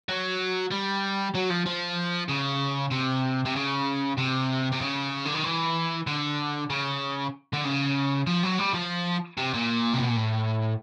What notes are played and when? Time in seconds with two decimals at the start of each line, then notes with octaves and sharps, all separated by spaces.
0.09 F#3
0.71 G3
1.35 F#3
1.50 F3
1.66 F3
2.29 C#3
2.91 C3
3.45 C3
3.56 C#3
4.18 C3
4.72 C3
4.81 C#3
5.25 D3
5.34 D#3
5.44 E3
6.07 D3
6.70 C#3
7.53 D3
7.64 C#3
8.27 F3
8.44 F#3
8.59 G3
8.74 F3
9.38 C3
9.54 A#2
9.94 C3
10.01 B2
10.08 A#2
10.16 A2